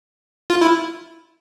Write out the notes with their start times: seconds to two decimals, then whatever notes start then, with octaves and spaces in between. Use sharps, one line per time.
0.50 F4
0.61 E4